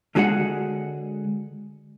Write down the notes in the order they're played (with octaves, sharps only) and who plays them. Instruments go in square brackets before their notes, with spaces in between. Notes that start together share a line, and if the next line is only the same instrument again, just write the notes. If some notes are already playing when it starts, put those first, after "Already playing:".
[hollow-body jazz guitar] D3 G#3 F#4 G#4 F#5